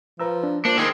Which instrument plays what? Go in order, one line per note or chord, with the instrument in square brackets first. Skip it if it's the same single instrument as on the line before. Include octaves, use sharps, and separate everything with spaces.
[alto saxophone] F3 [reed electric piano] B4 A#5 E6
[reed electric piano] D4
[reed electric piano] A#3 F4 [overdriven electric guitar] D4 [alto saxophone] C5
[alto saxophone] D#3 [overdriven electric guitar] C4 G#4